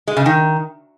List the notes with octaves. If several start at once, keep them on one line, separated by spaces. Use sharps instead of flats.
G#3
C#3
D#3